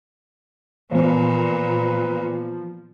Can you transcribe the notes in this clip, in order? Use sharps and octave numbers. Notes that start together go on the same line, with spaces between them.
A#2 E3 F3 B3 B4